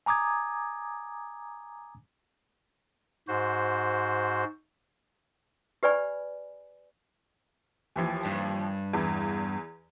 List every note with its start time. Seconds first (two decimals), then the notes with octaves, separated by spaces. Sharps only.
0.06 G#5 A#5 D6 D#6 G#6
3.28 G#2 F#4 C5
5.83 G4 B4 D5 G#5 B5
7.96 D#2 E3 F3
8.25 G2
8.93 E2 E3